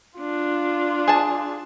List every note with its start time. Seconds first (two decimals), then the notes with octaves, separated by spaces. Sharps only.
0.17 D4 F4
1.08 G#4 A5